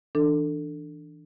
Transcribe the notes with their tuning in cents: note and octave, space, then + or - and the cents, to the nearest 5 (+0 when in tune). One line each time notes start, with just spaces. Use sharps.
E3 -25 D4 +10 A4 +20